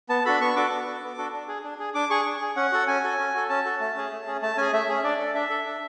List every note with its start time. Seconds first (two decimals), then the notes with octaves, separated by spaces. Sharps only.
0.09 B3 A5
0.25 D4 F#4 A4 B5
0.41 B3 C#6
0.56 D4 F#4 A4 D6
0.71 B3
0.87 D4 F#4 A4
1.02 B3
1.18 D4 F#4 A4
1.33 D4
1.48 G#4
1.64 D4
1.79 G#4
1.94 D4 D6
2.10 G#4 C#6
2.26 D4
2.41 G#4
2.56 C#4 F#5
2.72 F#4 A4
2.87 C#4 G#5
3.04 F#4 A4
3.19 C#4
3.34 F#4 A4
3.49 C#4 A5
3.65 F#4 A4
3.80 A3
3.96 C#4 G#4
4.11 A3
4.27 C#4 G#4
4.42 A3 A5
4.57 C#4 G#4 G#5
4.72 A3 E5
4.89 C#4 G#4
5.04 D4 D5
5.19 A4
5.35 D4 E5
5.50 A4
5.66 D4